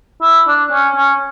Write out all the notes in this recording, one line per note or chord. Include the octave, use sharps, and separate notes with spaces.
E4
D4
C#4
C#4